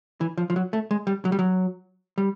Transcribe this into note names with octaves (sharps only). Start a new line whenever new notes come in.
E3
F3
F3
F#3
A3
G#3
G3
F#3
G3
F#3
G3